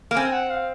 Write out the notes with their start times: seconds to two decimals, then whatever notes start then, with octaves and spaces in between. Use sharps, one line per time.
0.11 A#3
0.16 C4 G#5
0.33 F#5
0.50 F5